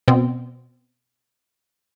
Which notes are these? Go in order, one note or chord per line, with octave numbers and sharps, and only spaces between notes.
B2 C4